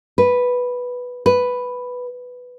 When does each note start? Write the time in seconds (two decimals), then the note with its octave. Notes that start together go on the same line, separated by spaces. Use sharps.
0.18 B4
1.26 B4